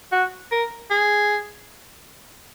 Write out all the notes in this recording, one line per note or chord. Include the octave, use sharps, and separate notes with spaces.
F#4
A#4
G#4